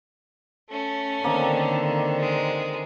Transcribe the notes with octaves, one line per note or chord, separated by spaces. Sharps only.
A3 C#4
D3 D#3 A#3 C4 D#5
G#3